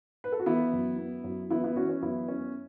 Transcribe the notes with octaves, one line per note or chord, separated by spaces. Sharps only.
B4
A4
F#4
E3 B3 E4
F#2
B3
F#2
E3 B3 E4
B3 E4
E3 C#4 F#4
C#4
F#2 B3 E4
B3 C#4